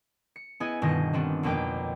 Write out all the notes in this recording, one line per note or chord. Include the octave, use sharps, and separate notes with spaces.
C#7
B3 E4 G#4 D#5 G#5
G1 B2 D#3 D#5 G6 A#6
D#3 G3 B3 C4 D4
B1 F2 A#3 B4 G5 D6